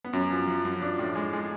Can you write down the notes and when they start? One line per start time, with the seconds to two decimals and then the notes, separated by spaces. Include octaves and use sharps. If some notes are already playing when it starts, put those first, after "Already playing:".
0.05 B3
0.13 F#2 C#4
0.30 F3
0.47 F3
0.65 F#2
0.81 F3 D4
0.99 A2
1.15 G#3
1.33 G#3